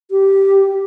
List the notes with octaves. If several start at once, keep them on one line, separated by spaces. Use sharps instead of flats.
G4